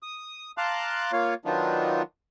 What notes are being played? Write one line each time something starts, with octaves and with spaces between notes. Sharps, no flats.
D#6
F5 A5 A#5 C6 D6 F#6
A#3 F4 C#5 F5
D#3 F#3 B3 D4 D#4 F4